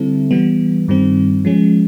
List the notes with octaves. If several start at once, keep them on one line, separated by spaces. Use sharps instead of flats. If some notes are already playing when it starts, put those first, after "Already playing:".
Already playing: D3 G3 C4 E4 A4
E3 G3 B3
G2 D#3 G3 C4
F3 G#3 C#4